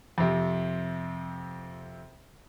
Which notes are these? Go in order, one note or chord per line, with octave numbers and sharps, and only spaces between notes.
F2 C3